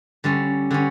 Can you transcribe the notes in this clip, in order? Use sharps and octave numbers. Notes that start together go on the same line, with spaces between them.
D3 G3 C#4
D3 G3 C#4